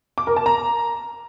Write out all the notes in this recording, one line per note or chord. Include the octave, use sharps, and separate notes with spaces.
D6
A#4
A5
A#5